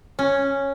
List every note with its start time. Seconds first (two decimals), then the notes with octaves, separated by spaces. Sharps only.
0.19 C#4